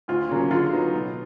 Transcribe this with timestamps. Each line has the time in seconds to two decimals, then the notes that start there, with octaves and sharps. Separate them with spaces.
0.08 D2 F4
0.29 C#3 F#3 A#3 C#4
0.51 D3 F4
0.72 F#3 B3 D#4
0.94 B2